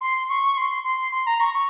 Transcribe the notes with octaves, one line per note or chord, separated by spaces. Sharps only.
C6
C#6
C6
C6
C6
A#5
C#6
C#6